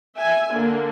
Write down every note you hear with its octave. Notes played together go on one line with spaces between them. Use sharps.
E5 G#5
D3 A#3